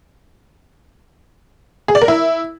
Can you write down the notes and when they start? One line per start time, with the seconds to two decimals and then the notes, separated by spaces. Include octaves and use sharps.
1.88 G#4
1.95 D5
2.02 A#4
2.08 E4